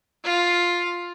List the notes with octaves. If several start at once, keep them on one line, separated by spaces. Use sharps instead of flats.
F4